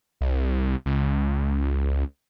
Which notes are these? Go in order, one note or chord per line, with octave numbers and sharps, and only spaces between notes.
C2
C#2